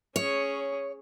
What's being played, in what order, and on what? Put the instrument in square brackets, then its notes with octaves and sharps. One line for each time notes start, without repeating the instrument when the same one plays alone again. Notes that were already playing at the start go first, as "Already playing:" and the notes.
[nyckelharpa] C#4 G#4 [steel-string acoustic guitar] C#5